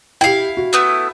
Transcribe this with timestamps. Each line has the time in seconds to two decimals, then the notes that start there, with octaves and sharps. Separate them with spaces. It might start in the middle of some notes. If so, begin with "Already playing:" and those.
0.21 E4 G4 F5 G5
0.57 F#4
0.73 A3 B3 E4